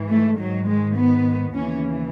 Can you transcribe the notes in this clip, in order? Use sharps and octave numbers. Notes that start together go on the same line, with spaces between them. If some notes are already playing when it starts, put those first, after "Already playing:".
Already playing: G#2 E3
A3
G#2 D#3 F#3
G#3
B3
D#2 C#3 E3 C#4